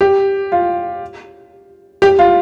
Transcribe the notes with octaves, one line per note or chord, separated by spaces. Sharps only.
G4
F4
G4
F4